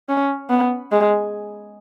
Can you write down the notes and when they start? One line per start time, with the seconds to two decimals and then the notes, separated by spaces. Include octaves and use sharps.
0.09 C#4
0.50 B3
0.92 G#3